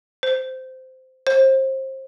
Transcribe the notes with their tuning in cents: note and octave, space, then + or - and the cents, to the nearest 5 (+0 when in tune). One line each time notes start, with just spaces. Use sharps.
C5 -15
C5 +30